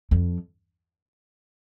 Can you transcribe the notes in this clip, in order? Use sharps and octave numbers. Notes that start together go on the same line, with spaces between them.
F2